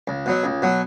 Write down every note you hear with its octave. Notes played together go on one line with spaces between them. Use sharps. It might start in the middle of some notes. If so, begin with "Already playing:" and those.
C#2
B2 F#3
C#2
B2 F#3